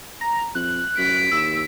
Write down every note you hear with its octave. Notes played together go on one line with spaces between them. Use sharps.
A#5
F2 F#6
F#2 B6 D7
D#2 E6